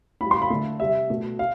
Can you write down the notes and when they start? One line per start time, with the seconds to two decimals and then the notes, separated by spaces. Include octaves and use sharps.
0.21 A2 G3 B5
0.31 C6
0.42 B5
0.50 D3 A3
0.80 C3 G3 E5
1.10 B2 A3
1.39 F5